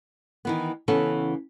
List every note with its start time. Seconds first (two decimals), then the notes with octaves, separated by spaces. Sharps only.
0.45 D#3 E3 B3
0.88 C#3 E3 B3 C#4 A4